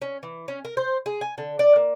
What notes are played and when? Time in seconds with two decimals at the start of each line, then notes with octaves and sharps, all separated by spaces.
0.02 C#4
0.23 E3
0.48 C#4
0.65 A#4
0.77 C5
1.06 G#4
1.21 G#5
1.38 D3
1.59 D5
1.76 A#3